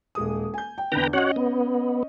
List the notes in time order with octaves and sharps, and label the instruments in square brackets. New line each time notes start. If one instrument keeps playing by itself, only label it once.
[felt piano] D#1 G#3 D#6
G#5 G6
G5
[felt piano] E2 D3 [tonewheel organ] B4 G5 A#5
[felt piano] C#4 D#5 [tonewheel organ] F#4 C#5 F#5
[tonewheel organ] B3